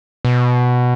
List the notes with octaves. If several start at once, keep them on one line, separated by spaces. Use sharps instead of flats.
B2